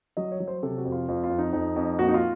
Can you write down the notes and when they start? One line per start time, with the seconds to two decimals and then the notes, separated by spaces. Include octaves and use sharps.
0.17 F#3 D#5
0.32 C#5
0.40 F#3
0.48 C5
0.63 C3 A4
0.78 F#4
0.85 F2
0.92 F4
1.08 F2 F4
1.24 F4
1.30 F2
1.38 D#4
1.53 F2 D#4
1.76 F2
1.99 A#2 F#4
2.08 D#4
2.14 F4